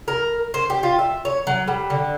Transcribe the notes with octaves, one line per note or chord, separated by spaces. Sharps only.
A#4
C5
G4
F4
E5
C#5
F#3
G3
D3